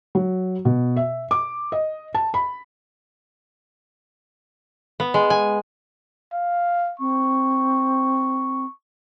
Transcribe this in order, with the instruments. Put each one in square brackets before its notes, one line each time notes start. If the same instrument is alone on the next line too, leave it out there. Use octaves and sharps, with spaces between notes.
[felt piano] F#3
B2
E5
D6
D#5
A5
B5
[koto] B3
G#3
G#5
[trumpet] F5
[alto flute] C4 [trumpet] C#6